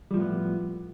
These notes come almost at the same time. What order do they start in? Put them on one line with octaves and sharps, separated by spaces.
G3 F3 A2 B3